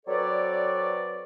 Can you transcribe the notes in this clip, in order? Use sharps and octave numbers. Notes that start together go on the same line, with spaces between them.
F#3 C4 A4 B4 C#5 D5